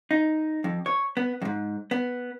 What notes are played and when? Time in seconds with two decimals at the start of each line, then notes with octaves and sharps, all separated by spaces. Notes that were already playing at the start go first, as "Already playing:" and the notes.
0.11 D#4
0.64 F2
0.86 C#5
1.17 B3
1.42 F2 G#2
1.91 B3